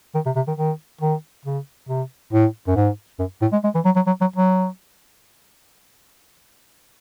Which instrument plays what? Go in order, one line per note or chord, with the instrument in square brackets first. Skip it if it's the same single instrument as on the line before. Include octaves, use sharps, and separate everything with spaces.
[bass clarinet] D#3
C3
C3
D#3
D#3
D#3
C#3
C3
A2
F#2
G#2
F#2
A2
G#3
G#3
E3
F#3
F#3
F#3
F#3
F#3